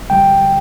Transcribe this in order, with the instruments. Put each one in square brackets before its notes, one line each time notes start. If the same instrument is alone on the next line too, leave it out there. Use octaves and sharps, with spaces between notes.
[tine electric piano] D3 G3 G5